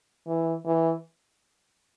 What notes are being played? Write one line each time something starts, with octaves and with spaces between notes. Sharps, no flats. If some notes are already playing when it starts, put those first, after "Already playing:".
E3
E3